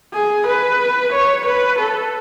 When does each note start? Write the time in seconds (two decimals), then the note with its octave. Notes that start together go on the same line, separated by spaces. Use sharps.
0.13 G#4
0.46 B4
1.12 C#5
1.45 B4
1.78 A4